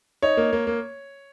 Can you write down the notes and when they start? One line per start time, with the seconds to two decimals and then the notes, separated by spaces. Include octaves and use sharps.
0.22 D#4 C#5
0.37 A#3
0.53 A#3
0.67 A#3